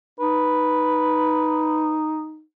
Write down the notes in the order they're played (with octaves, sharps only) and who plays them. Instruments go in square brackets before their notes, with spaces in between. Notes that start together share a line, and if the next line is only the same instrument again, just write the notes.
[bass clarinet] D#4 [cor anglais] B4